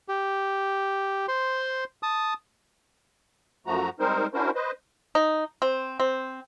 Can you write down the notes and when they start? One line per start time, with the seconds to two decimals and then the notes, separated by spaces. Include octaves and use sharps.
0.08 G4
1.28 C5 C6
2.03 A5 D#6
3.67 F#2 F3 A3 F#4 A#5
4.00 G3 G#3 C4 D#4 A#4 C5
4.34 C#4 D4 E4 F#4 A#4 C5
4.55 B4 C5 D#5
5.15 D#4
5.62 C4
6.00 C4